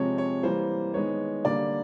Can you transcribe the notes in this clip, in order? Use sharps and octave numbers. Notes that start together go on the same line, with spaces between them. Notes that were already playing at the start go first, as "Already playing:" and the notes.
Already playing: C3 F3 G#3 C4 C#5
C#5
E3 G3 A#3 C5
D#3 G#3 B3 C#5
D3 G3 A#3 D5